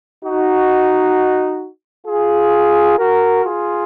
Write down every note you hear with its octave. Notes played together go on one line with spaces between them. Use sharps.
D#4 F#4
F4 G#4
F#4 A#4
F4 G#4